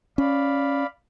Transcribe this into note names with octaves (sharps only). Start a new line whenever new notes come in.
C#4 D5 F5 B5